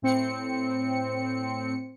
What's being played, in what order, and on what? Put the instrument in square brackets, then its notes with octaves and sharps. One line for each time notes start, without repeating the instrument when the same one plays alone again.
[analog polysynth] A2 C4 C#7